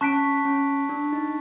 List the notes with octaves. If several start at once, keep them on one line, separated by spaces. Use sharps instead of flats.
C#4 A5 C#6 F#6 B6 D7
C#4
D4
D#4